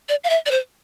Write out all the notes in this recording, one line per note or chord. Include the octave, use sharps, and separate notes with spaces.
D5
F5
E5
D5
C5